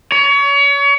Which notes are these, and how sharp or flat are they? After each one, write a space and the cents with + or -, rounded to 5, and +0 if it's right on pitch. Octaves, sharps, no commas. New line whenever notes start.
C#5 +30